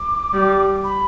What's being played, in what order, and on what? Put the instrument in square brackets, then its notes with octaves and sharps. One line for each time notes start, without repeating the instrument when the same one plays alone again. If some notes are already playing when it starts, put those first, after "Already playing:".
Already playing: [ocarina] D6
[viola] G3
[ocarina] B5